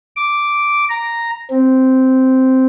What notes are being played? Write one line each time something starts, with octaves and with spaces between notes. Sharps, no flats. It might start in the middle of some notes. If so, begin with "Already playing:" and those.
D6
A#5
C4